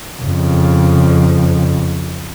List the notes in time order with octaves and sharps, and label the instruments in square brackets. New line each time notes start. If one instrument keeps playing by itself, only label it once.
[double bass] F2 C#3